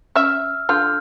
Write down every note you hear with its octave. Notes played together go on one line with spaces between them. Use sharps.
C#4 E5 E6 F6
D3 F4 F6 G6